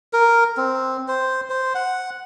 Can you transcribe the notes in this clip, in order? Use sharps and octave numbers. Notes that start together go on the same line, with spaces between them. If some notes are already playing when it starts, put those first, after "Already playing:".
A#4
C4
C5
C5
F#5